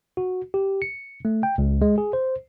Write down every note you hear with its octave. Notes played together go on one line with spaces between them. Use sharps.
F#4
G4
C#7
A3
G5
C#2
G#3
G#4
C5